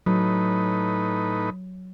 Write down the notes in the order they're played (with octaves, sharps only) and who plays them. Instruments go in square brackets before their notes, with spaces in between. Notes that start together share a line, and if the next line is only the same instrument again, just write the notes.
[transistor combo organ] A2 D#4 B4 [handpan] F#3